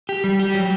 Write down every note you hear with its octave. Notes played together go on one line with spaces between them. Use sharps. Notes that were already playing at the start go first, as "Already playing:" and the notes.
G4
G3
G4
F#3